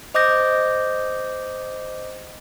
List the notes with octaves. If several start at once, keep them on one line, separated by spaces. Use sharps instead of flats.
C5 D#5 D6 D#6 G6 A#6